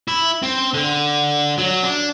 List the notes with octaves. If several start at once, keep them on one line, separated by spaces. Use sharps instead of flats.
E4
C4
D3
F#3
D4